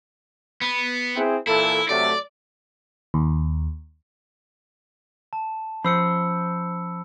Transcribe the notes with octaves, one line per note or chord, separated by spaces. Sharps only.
B3
C4 E4 G#4
A#2 E3 E4 A4
C3 F#3 A3 D5
D#2
A5
F3 C#4 C5 B5 E6 C#7